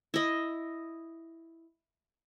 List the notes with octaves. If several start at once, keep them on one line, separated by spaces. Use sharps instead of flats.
E4 D#5